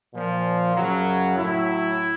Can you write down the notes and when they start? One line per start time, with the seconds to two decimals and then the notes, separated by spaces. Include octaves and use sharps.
0.13 A#2 F3
0.75 F#2 C#3 F#3
1.37 A2 F#3 E4